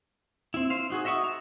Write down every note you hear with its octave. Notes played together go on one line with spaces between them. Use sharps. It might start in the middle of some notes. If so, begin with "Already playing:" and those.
C4 E4
C5 F5
D#4 F#4 G#4
D#5 E5 F#5 C#6 D#6
A5 A#5